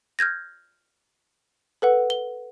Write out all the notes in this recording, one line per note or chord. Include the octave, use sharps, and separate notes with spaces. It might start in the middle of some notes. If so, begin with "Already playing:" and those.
F6 G6 G#6 A#6
A4 B4 F#5
G7